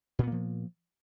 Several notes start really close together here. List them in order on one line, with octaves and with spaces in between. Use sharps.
A#2 B3 A#3 F3